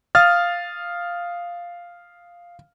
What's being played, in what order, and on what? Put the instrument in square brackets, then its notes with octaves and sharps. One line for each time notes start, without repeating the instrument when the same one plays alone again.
[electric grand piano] F5 D#6 F6 A6